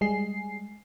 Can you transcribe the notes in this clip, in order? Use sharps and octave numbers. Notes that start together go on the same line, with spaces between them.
G3 G#3 G#4 C7